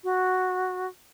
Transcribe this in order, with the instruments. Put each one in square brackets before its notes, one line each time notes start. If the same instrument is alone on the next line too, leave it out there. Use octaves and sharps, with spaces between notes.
[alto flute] F#4